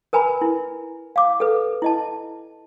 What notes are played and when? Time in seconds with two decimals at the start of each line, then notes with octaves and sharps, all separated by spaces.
0.13 A#4 B4 G#5 A#5 B5
0.41 E4
1.16 F5 D6
1.40 A4 B4
1.82 E4 D#5 A5